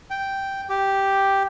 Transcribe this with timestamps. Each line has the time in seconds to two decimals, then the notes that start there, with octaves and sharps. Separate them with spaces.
0.10 G5
0.70 G4